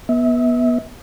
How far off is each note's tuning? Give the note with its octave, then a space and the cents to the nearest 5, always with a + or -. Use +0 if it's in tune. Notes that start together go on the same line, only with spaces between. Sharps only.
B3 -20 E5 -30